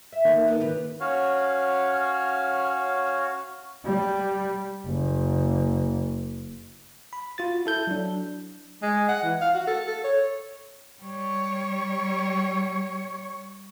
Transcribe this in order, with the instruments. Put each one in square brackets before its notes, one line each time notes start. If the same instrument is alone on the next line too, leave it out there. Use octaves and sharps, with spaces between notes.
[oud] E5
[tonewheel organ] D#3 A#3 [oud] D#4 A4
[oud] B3 D4
C#3 G4 B4
[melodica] C#4 F#4 C#5 F5
[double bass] G3
F#1
[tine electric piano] B5
F4 F#4 A6
E4 A4 G6
F#3 D4
[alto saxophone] G#3
F#5
E3
F5
F#4
A4
A4
C#5
[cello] G3 C#5